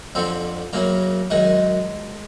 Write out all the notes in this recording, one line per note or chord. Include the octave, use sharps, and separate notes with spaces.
F2 D3 F3 C4
F#2 C#3 F#3 A#3
F#2 D#3 F#3 G#3